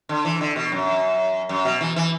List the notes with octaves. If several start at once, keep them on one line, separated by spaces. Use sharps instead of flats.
D3
E3
D3
B2
F#2
F#2
B2
E3
E3